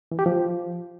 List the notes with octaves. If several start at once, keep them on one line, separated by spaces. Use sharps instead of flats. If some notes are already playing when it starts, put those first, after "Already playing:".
E3
G4
F3